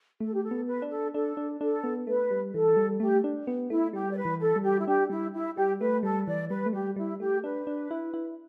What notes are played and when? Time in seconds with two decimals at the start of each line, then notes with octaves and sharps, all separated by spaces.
0.20 A3 A4
0.33 G4
0.44 A4
0.51 B3
0.67 B4
0.82 D4
0.91 A4
1.14 D4 A4
1.37 D4
1.60 D4 A4
1.84 B3
2.07 A3 B4
2.31 G3
2.53 E3 A4
2.76 G3
3.00 A3 G4
3.24 D4
3.47 B3
3.70 A3 E4
3.93 G3 G4
4.12 D5
4.17 B4
4.25 E3
4.40 A4
4.56 G3
4.63 G4
4.79 E4
4.87 D4 G4
5.10 G3 E4
5.33 E4
5.56 G3 G4
5.80 A3 B4
6.03 G3 A4
6.27 E3 D5
6.50 G3 B4
6.66 A3
6.73 G3 G4
6.96 G3 E4
7.20 A3 G4
7.43 D4 B4
7.67 D4
7.91 E4
8.14 E4